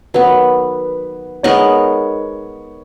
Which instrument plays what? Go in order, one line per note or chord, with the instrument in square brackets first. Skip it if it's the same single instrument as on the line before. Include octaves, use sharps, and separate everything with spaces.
[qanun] D#3 F#3 B3 [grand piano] B4
[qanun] G#3 B3 D#4 A#4 [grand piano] C#5